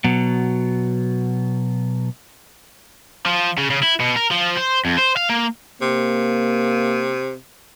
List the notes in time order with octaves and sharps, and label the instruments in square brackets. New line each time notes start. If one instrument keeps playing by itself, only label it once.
[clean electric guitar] B2 F#3
[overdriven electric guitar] F3
C#3
C#3
E4
B2
A#4
F3
C5
F2
C5
F5
A#3
[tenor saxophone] C3 [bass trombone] A#3